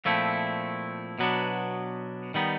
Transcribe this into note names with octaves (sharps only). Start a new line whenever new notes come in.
A#2 F3 A3 C4 E4
B2 F#3 B3 D4
D#3 G3 B3 D#4